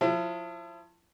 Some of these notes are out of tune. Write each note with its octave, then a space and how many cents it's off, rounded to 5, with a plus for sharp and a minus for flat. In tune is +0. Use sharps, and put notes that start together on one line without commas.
F3 +35 E4 +40